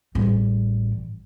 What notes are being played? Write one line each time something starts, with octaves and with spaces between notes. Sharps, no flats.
A1 G3